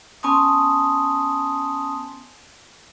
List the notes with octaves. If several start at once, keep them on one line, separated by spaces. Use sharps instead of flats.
B3 C#4 G#5 A5 C6 D#6